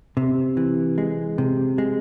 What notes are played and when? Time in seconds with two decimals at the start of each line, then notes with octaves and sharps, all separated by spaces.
0.17 C3
0.57 E3
0.98 G#3
1.38 C3
1.78 G#3